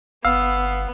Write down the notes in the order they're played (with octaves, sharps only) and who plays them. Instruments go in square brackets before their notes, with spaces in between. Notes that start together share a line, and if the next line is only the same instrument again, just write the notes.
[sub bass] G1 [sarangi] B3 [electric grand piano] F5 [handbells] E6